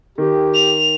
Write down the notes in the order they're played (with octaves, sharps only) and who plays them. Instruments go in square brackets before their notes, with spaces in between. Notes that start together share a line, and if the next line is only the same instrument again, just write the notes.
[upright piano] D#3 [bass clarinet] G4
[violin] F7